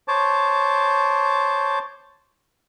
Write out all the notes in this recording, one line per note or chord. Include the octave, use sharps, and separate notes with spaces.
C5 C#5 A5 D6